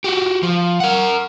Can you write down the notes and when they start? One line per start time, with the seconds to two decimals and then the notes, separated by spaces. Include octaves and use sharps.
0.04 F#4 G4
0.43 F3
0.80 A#4 F#5